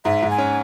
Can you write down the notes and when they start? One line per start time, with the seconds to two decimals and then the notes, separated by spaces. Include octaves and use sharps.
0.05 G#2 E5
0.22 G#2
0.30 G#5
0.38 C#4